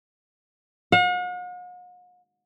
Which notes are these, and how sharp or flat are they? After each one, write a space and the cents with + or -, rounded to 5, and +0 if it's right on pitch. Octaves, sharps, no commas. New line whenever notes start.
F#5 -45